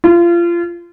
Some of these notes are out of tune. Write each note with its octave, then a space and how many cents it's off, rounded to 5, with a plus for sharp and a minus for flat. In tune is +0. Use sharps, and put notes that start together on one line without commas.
F4 -30